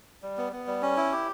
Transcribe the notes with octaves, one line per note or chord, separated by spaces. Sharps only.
G3
B3
B3
G3
C#4
E4
G4